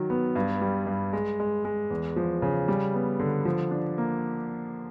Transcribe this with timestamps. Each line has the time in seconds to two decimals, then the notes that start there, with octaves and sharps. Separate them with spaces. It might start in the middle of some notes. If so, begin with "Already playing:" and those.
Already playing: D#3 F#3
0.10 B3
0.36 G2
0.61 G3
0.87 G2
1.13 G#3
1.40 G#3
1.65 G#3
1.91 E2
2.16 F3
2.42 C#3
2.68 G3
2.94 B3
3.20 D3
3.45 F3
3.71 D4
3.98 A#3